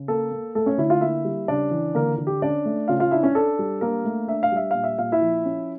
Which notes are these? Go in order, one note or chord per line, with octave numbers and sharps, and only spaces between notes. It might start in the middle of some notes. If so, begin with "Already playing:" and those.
Already playing: C#3
A#3 A4
A#3
A3 A4
C#4 C#5
D3 E4 E5
F4 F5
A#3 E4 E5
G3
C#3 D4 D5
E3
D3 A#3 A#4
D3
G4
C#4 D4 D5
A3
C#3 F4 F5
F4 F5
D4 E4 E5
C#4 C#5
D4 A4
G3
A#3 D4 A#4
A3
D4 E5
F5
G3 E5
A#2 F5
E5
A#2 F5
E4 E5
F3
C#4